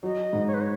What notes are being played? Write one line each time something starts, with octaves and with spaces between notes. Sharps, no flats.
F#3 D#5
G#2
C#5
B4
C#5